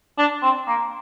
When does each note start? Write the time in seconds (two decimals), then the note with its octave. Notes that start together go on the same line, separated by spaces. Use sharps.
0.18 D4
0.43 C4
0.67 A#3